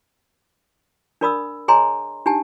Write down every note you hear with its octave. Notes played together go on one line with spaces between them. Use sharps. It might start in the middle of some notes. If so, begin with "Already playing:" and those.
D4 A#4 D5 B5 D#6 E6
G#4 C#5 D#5 G#5 A#5 C6
D4 D#4 G4 G#5 A5